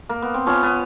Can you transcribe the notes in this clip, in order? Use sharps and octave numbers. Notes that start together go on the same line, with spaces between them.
A#3
B3
C4
F3 B3 C#4
B3